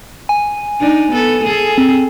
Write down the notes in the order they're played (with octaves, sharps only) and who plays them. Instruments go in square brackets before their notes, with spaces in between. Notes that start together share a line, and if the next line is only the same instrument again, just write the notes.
[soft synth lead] G#5
[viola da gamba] D4 D#4
B3 A4
G#4 A4
[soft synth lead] C4